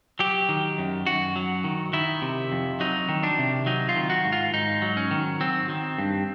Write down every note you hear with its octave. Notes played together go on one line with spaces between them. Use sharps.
F#3 G4
D#3
F#2
F#2 F#4
F#3
D#3
D#3 E4
C3
F2
F#3 D#4
D#3
D4
C3
F#3 D#4
F4
D#3
F#4
G#2
F4
G#2 D#4
F#3
C#4
D#3
F#3 C4
D#3
G2